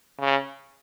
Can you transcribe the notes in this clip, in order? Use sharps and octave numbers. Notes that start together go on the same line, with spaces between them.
C#3